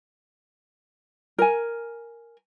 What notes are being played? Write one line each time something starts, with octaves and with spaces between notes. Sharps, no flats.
A#4 G#5